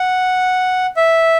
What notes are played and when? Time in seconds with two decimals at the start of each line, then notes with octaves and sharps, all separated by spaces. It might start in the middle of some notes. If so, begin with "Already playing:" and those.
Already playing: F#5
0.97 E5